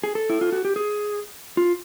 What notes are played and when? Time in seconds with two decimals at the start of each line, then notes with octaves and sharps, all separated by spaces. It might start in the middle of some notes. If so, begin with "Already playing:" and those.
0.04 G#4
0.15 A4
0.30 E4
0.41 F4
0.52 F#4
0.65 G4
0.76 G#4
1.57 F4